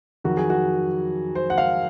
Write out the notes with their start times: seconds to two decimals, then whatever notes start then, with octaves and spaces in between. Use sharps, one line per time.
0.24 F2 D#3 F#3 F#4
0.37 G#4
0.50 F#4
1.35 C5
1.50 F#5
1.58 F5